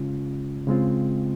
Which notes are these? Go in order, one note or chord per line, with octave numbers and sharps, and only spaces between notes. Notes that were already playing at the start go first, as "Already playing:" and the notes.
Already playing: C#3 G#3 C#4 F4
C#3 G#3 C4 F4